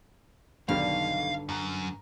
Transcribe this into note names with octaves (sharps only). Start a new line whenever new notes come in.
B1 G2 D3 D#3 G4 F5
F#2 A#5